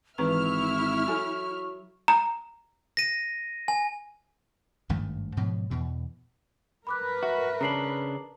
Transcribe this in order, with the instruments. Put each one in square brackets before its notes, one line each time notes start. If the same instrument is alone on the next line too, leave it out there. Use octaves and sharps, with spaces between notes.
[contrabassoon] G#1 [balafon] E3 B4 A#5 [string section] E4 E5 F6 [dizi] C#6
[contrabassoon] F#3 [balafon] A4 G#5
[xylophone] A#5
[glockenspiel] A#6 D#7
G#5
[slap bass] G#1 G2 D#3 A3
G#2 B2 F3 F#3
E2 B2 E3
[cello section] A#4 B4 [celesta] B5 D6 F#6
[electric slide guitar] F#4 [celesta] E5
[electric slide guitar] C#3 D4 [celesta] A#5 C7 F#7